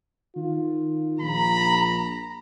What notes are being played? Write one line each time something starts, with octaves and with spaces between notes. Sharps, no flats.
D#3 F4
A#1 A#5 B5